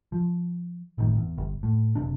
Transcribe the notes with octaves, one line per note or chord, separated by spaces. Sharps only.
F3
G1 A2 D#3
E2
G1
A2
F#1 C3 D4